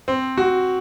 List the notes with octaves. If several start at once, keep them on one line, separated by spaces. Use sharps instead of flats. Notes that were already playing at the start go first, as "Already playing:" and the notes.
C4
F#4